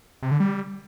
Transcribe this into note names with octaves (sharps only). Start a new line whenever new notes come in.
C3
D3
G3